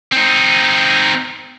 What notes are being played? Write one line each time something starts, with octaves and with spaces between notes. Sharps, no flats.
C4 D#4